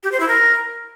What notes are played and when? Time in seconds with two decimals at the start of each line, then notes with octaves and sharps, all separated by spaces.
0.03 G4
0.12 C5
0.20 E4
0.28 A#4